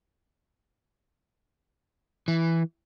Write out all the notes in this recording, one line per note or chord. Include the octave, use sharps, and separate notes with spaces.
E3